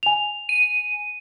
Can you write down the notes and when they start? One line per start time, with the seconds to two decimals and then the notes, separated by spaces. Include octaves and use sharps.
0.03 G#5 F7
0.49 D#7